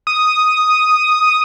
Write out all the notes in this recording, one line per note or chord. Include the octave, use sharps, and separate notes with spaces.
D#6